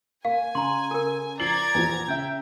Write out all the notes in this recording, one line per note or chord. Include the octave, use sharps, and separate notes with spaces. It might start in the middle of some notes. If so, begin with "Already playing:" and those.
A#3 F5 G#5
C#3 A#5 C6
A4 A#4
F3 D5 A#5 G#6 C7 F#7
E2 A#2 F3
C#3 E5 G5